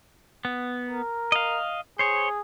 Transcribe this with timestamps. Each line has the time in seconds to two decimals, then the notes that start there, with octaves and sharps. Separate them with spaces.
0.45 B3
0.89 A#4
1.32 D#5 F5
1.99 G#4 C5 C#5